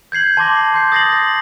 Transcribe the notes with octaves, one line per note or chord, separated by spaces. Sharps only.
G6 G#6 C7 F#7
A5 C6 D6 A#6
C6 G6 C7
D#6 A6 A#6 C7 F#7
A#6